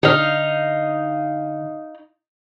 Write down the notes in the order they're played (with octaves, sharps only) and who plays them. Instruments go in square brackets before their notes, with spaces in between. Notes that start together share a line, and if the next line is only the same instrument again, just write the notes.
[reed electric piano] D3 [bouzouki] D#4 F5